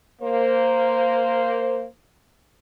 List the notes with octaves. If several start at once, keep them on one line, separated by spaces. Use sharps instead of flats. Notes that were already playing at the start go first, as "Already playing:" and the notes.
A#3 C5